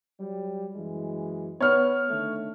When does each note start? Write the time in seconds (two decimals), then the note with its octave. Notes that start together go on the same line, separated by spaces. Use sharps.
0.20 F#3 G3
0.75 F#2 E3 G#3
1.60 B3 C#5 F6
2.09 D3 D#3 A3